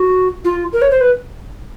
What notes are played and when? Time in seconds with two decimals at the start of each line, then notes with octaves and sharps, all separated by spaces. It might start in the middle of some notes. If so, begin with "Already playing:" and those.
Already playing: F#4
0.45 F4
0.73 A#4
0.82 C#5
0.91 C5
1.01 B4